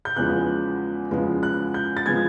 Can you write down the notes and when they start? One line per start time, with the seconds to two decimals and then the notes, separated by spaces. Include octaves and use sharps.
0.05 G6
0.16 E2 C#3 F3 G#3 B3 F#6
1.11 E2 C#3 F3 G#3 B3
1.43 F#6
1.74 G6
1.97 A6
2.06 C#3 F3 G#3 B3 G#6